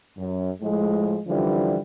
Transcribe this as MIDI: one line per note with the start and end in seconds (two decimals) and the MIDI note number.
0.18 0.49 42
0.62 1.19 45
0.62 1.19 53
0.62 1.19 56
1.27 1.78 42
1.27 1.78 50
1.27 1.78 52
1.27 1.78 53
1.27 1.78 55